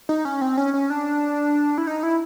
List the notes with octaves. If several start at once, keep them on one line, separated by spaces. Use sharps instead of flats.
D#4
C#4
C4
C#4
C#4
D4
E4
D#4
E4